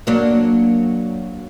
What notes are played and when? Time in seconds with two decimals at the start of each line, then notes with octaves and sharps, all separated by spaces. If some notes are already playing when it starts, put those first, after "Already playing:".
0.07 F#3 A#3 D4